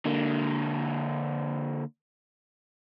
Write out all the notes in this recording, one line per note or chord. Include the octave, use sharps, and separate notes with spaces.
D3 A#3